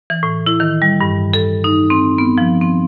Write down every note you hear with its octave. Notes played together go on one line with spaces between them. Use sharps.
E3
A2
E4
D#3
G3
G2
A4
D#4
C4
B3
F3
C4